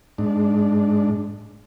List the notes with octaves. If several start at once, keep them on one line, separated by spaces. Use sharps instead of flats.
G#2 D4